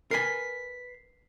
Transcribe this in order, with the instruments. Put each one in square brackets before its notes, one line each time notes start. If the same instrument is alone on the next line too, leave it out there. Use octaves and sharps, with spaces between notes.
[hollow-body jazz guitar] A#4 B4 G#5 [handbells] B6 C7